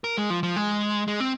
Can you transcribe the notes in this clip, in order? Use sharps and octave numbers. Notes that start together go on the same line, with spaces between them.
A#4
G#3
F3
F3
G#3
G#3
C4